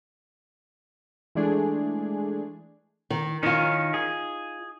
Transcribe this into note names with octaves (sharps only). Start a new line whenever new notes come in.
E3 G#3 A3 D4 G#4
D#3
D#3 C#4 D#4 F4
G#4